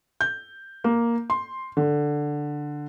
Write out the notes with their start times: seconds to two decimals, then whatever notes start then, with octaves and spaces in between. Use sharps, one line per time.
0.21 G6
0.84 A#3
1.30 C6
1.77 D3